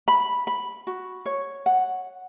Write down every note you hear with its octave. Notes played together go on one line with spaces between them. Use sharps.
B5
B5
F#4
C#5
F#5